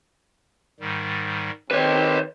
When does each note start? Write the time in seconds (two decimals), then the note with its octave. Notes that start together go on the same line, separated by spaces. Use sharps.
0.80 G#2 D#3 G3
1.71 D#3 C4 G4 B4 C#5